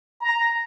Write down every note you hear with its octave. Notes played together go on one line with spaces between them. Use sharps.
A#5